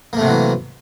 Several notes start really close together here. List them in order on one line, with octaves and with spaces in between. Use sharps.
A#3 A3 C3 F#3 E3